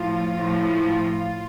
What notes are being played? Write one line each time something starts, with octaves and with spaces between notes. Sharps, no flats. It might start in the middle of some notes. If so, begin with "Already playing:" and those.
Already playing: A2 F3 F4
A2 F3